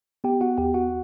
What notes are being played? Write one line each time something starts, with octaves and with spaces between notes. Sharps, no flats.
B3 G4 G5
F#4 F#5
D#2 G4 G5
F#4 F#5